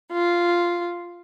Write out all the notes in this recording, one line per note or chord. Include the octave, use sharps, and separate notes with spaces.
F4